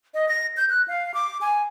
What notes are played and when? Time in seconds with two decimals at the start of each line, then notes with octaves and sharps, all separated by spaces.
0.14 D#5
0.28 A#6
0.57 G6
0.70 F#6
0.88 F5
1.14 D6
1.41 G#5